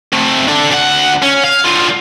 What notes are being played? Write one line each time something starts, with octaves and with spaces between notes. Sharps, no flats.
C3 A3
D4 A4
D2 F#5
C#4
F5
D3 F3